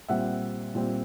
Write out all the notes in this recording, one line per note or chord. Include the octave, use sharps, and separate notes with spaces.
A#2 G3 C4 E5 F#5
A#2 G3 C4